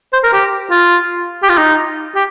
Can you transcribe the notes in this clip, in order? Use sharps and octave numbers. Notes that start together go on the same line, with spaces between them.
C5
A#4
G4
F4
G4
F4
D#4
G4